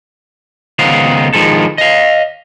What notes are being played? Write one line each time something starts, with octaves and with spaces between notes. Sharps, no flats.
C#2 D#3 B3 D#4 C5 F5
D#3 F3 G#3 A4
D#5 F5